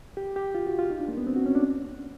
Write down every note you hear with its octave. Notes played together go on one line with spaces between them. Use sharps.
G4
G4
F4
F#4
F4
D#4
D4
A#3
B3
C4
F#4
C#4
D4